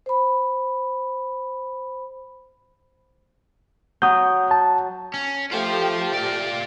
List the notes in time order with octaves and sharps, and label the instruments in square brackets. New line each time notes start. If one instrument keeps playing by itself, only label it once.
[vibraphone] C5 B5
[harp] F#3 [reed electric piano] D#6 G6
[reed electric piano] A5
[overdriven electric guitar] C#4
[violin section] A3 G4 [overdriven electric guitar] F4 C5
[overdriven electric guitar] F4 D5